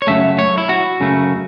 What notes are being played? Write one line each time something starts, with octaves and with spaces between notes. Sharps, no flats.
C#5
F#2 C#3 A3 E5
C#5
E4
F#4
F#2 C#3 A3